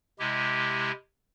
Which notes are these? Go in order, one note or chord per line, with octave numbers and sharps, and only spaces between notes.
C3 G#3 E4 G4